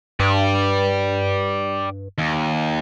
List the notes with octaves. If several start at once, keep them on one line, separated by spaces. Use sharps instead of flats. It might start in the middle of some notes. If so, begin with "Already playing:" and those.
G2 G4 D5
D#2